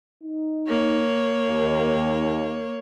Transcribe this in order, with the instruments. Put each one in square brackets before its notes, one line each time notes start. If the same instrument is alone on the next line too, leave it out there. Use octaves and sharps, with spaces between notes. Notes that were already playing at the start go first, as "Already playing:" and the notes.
[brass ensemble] D#4
[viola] A#3 C#5
[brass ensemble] D#2